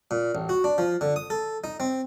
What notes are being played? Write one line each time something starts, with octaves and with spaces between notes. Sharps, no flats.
A#2
A1
F#4
D4
F3
D3
D#6
A4
D#4
C4